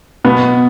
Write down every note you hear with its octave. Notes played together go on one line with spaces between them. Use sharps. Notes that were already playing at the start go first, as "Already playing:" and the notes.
B2 B3